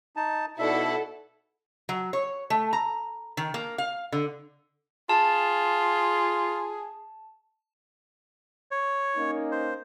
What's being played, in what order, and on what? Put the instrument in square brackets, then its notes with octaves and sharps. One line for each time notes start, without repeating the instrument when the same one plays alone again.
[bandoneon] D#4 A5
[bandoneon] B2 E5 [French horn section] D#4 D5 [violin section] E4 A4 F#5
[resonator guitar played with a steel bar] F#3
C#5
A3
A#5
D#3
A#3
F5
D3
[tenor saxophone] F4 [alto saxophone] G#4 [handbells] A5
[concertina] C#5
[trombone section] A#3 C#4 D#4
[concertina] C5